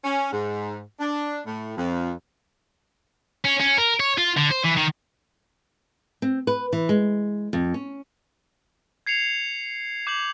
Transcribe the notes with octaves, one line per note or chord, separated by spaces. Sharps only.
C#4
G#2
D4
A2
F2
C#4
C#4
A#4
C#5
F4
D3
C5
E3
D#3
C4
B4
E3
G#3
F2
C#4
G#6 C7 C#7 F7
D6 G6 F7 F#7